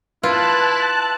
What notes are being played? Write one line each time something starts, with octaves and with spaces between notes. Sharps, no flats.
E4 F4 B4 A5 F#6